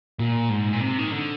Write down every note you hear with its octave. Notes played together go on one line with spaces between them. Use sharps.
A#2
G#2
A#2
C3
D#3
D3